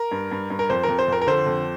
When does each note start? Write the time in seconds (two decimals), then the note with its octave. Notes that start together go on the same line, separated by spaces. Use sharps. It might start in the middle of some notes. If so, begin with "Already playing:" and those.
Already playing: A#4
0.11 G2
0.31 G2
0.50 G2
0.59 A#4
0.70 F2 C5
0.83 A#4
0.89 F2
0.99 C5
1.08 F2 A#4
1.22 A#4
1.27 D3 C5
1.46 F2